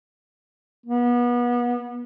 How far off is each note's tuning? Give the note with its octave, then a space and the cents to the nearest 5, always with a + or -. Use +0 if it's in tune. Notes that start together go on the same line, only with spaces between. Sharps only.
B3 -30